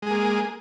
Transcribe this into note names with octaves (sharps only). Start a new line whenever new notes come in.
G#3 A#3 G#4